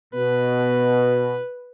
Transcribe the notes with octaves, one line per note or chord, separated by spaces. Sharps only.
B2 B4